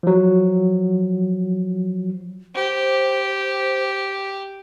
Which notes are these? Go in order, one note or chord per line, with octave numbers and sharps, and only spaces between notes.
F3 F#3
G4 C5